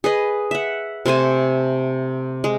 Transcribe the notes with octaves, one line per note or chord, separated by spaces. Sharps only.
G#4 B4 D#5
E5 F#5
C3 A3 C5 G#5
G#3